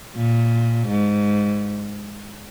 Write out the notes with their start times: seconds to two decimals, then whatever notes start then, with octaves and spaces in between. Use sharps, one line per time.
0.16 A#2
0.88 G#2